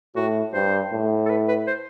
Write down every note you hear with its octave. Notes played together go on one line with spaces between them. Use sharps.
A2 F#4
G2 C5
A2
A4
B4
B4
C5